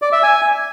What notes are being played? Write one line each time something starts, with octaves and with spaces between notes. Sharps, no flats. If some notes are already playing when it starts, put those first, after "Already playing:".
D5
E5
G#5